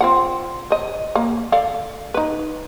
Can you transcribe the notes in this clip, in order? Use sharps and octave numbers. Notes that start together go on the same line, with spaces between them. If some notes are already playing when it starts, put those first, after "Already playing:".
C4 F4 F#5
C5 D#5
A#3
A4 D5 F5
D#4 B4